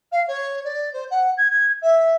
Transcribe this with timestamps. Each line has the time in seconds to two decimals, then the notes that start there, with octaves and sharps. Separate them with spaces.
0.12 F5
0.27 C#5
0.64 D5
0.93 C5
1.11 F#5
1.37 G#6
1.50 G#6
1.82 E5